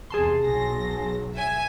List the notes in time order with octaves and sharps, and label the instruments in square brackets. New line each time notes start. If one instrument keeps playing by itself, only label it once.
[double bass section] E2 C3 [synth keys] G#4 A5 C6
[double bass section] B1 F#3 [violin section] A#6
[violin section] E5 G#5